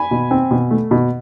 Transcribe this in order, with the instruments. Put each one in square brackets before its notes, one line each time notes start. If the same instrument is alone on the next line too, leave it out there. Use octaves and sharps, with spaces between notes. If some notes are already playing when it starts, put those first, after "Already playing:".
Already playing: [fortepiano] G#5 B5
B2
C4
B2
A3
B2